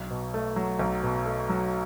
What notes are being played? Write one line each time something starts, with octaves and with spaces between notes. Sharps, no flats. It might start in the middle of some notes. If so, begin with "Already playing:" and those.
Already playing: B1
B2
A3
F#3
B1
B2
A3
F#3